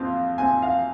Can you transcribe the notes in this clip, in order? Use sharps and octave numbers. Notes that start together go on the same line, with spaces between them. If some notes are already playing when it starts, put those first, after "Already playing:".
Already playing: F2 C4 F5
C4 G#5
F5